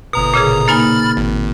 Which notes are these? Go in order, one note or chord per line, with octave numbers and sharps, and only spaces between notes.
G1 B2 A#5 D#6
A#2 C#3 G#4
A#3 D#4 G#5 B5 F6 A6
G#1